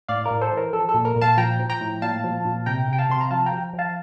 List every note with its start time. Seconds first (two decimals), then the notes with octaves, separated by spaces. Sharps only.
0.08 A2 D5 F5
0.24 A#4 D5
0.31 A2
0.41 A4 C5
0.52 E3
0.57 A#4
0.73 F3 A4
0.89 A4
0.94 A#2
1.05 A#4
1.16 A#2
1.21 F5 A5
1.37 F3 G5 A#5
1.60 F3
1.70 G5 A#5
1.81 A2
2.02 A#2 F5 A5
2.24 F3
2.45 A#2
2.66 C3 G5 A#5
2.88 C3 G5
2.98 F5 A5
3.09 C3 C6
3.21 A#5
3.31 F3 F5 A5
3.46 G5 A#5
3.52 F3
3.73 F3
3.79 F5 A5